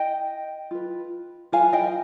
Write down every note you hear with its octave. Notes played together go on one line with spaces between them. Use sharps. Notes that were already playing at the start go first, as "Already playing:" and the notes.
Already playing: D#5 G5
F4 B4
F4 B4 F5 G#5
D#5 G5